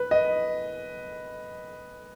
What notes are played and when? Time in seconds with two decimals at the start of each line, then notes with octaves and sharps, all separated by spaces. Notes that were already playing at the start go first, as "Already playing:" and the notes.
Already playing: B4
0.11 D#5